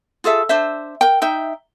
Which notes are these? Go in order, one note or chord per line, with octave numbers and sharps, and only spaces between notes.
F4 G#4 A4 E5
D4 C5 E5
A#4 G5
D#4 E5 G5